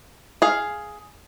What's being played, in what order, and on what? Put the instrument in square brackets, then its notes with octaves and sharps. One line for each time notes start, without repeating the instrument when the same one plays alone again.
[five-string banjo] G#4 F5